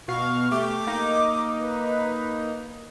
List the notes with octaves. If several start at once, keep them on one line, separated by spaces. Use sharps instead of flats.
B2 F5 C#6
A3 G4 D6
A#3 D#4
B4